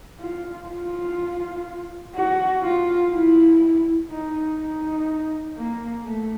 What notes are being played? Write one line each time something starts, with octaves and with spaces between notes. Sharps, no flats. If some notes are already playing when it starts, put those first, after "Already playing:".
F4
F4
F#4
F4
E4
D#4
D#4
A#3
A3